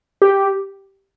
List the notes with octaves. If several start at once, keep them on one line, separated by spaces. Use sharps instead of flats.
G4